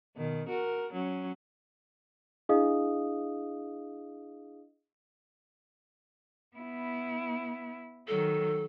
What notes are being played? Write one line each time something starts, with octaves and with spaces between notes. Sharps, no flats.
B2 D#3
F#4 A#4
F#3 C#4
D4 E4 G#4 D#5 F5 D#6
B3 E4
D#3 F#3 A4